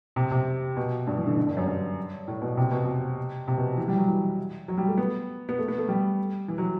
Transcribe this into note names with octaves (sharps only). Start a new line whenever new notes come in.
C3
C3
B2
G2
E3
D3
D3
G2
F#2
G2
A2
B2
C3
B2
C3
C3
B2
E3
G3
F#3
E3
F#3
G3
A3
B3
B3
A3
B3
A3
G3
E3
F#3